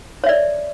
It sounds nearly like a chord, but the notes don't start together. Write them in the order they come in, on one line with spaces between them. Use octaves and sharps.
C#5 E5 D5